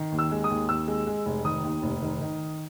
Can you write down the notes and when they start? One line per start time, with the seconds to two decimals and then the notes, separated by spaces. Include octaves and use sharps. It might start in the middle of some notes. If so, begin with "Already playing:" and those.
Already playing: D#3
0.12 D#2
0.19 E6
0.31 G#3
0.44 D#6
0.50 D#2
0.69 D#2 E6
0.88 G#3
1.07 G#3
1.26 F1
1.45 D#3 D#6
1.64 D#2
1.83 F1
2.02 D#3
2.21 D#3